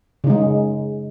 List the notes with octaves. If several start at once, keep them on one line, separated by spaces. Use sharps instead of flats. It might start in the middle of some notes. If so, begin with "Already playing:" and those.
C#3 G#3 D#4